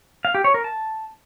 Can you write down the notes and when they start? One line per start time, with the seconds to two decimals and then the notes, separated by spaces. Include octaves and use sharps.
0.25 F5
0.35 G4
0.44 C#5
0.54 A#4
0.64 A5